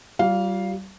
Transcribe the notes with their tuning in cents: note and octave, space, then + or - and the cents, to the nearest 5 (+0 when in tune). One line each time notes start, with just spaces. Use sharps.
G3 -30 F4 +0 F5 +0